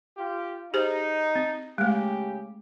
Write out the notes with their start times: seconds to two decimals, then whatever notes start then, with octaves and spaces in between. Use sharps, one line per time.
0.17 F4 G4
0.74 D#4 G4 G#4 C5
1.35 C4
1.78 C#3 G#3 A3 G4